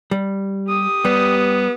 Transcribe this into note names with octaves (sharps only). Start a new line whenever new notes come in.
G3
G4 D#6
G3 B3